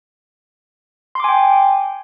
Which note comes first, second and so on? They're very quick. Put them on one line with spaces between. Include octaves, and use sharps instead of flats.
C6 D6 G#5 G5